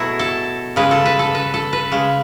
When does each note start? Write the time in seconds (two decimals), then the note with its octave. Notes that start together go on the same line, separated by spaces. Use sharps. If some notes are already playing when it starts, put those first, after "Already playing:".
Already playing: B2 F#3 A3 E4 F#4 G#4
0.19 A4
0.76 C#3 G#3 B4
0.91 A4
1.05 B4
1.19 A4
1.35 B4
1.54 A4
1.73 B4
1.91 C#3 G#3